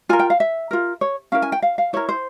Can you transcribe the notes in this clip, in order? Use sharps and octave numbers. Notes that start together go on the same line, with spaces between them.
F4 A#4 G#5
G5
F5
E5
F4 A#4
C#5
C#4 E4 A#4 F5
G#5
G5
F5
F5
E4 A#4 C#5
C5